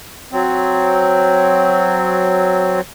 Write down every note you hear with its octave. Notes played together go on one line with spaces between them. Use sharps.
F#3 C4